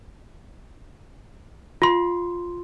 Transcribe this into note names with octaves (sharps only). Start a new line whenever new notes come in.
F4 C6